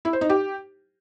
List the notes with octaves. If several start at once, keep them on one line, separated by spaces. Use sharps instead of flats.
E4
C5
D#4
G4